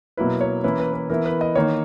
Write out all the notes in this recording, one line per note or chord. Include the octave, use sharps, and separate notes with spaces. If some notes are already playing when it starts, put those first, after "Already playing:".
B2 F#3 A#3 E4 B4
C#5
E3 A#3 C#4 E4 B4
B4
B4
E3 B3 E4 A#4
B4
D#5
D#3 A#3 D#4 C#5